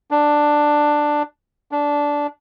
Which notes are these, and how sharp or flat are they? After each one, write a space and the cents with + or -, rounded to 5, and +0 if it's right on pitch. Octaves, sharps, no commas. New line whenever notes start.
D4 +10
D4 -10